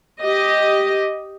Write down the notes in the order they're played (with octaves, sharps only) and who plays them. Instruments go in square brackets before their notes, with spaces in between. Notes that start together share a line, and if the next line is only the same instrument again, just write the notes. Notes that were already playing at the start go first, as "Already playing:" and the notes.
[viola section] G4 D#5